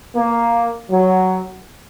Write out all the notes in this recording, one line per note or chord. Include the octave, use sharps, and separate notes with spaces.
A#3
F#3